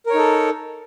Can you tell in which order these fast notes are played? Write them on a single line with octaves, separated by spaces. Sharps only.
A#4 C#5 D#4 A4